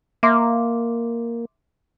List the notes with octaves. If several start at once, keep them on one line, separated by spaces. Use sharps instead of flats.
A#3 E5 C6 D6